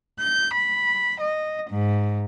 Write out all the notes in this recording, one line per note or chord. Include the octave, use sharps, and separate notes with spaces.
G6
B5
D#5
G#2